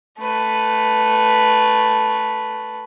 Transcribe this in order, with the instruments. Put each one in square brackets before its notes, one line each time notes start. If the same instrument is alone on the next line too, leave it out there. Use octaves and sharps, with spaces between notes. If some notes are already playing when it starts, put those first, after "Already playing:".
[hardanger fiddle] A3 B4